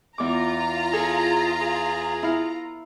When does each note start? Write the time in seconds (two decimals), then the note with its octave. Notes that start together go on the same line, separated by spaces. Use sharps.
0.18 E2 F4 A#5 D6
0.93 G#4 A4
1.61 G#4
2.23 E4 F5